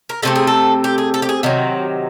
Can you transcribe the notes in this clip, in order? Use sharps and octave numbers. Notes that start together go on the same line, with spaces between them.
A#4
C3 F3 A3 C4 A4
G#4
A4
G4
G#4
A4
G4
G#4
C3 D#3 F#3 F#4